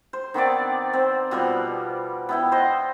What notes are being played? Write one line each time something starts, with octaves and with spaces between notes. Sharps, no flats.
C5
D#3 B3 C4 D5
C4 C5
B2 F3 G3 B3
B3 E4 G5
C5 D#5